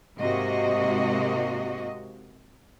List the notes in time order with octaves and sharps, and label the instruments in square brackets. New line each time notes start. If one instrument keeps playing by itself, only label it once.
[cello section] G#2 C3 A#3 F#4 D#5